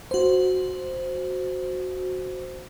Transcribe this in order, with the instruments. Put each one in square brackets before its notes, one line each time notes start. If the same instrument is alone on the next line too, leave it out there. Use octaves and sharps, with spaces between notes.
[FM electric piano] F#4 C5